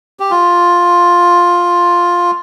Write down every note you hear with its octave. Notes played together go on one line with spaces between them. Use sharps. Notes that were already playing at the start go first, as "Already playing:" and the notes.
G4
F4